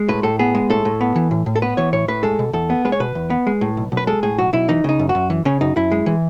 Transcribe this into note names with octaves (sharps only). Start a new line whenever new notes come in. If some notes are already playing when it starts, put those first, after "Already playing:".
Already playing: G#3
A2 B4
A2 A4
B3 G#4
G#3
A2 A4
A2
B3
E3
A2
A2
A4
B3 B4
E3 C#5
A2 C#5
A2 B4
G#3 A4
B2
E2 A4
B3
G#3 B4
C#5
B2 B4
E2
B3
G#3
A2
B1
B1
B4
G#3 A4
A2 G#4
B1 F#4
B1 E4
E3 D#4
C#3 D#4
F#2
F#4
F#2
E3
C#3 C#4
F#2 D#4
F#2 E4
G#3
E3